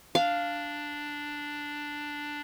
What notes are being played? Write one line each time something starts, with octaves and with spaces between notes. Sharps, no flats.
D4 F5